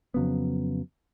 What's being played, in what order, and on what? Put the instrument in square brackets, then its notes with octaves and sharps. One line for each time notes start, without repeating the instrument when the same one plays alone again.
[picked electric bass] F2 C#3 F#3 B3